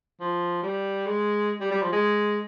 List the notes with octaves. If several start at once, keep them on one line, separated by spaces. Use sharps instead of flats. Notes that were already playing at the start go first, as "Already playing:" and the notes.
F3
G3
G#3
G3
G3
F3
G#3